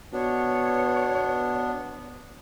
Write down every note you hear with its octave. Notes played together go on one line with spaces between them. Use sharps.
B2 B3 D4 C#5